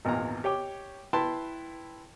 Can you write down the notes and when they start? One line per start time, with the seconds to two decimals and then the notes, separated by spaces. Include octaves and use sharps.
0.05 G#1 E2 A#2 A#5
0.44 G4 C#5 G5 D6
1.13 E4 B4 G5 A5 C6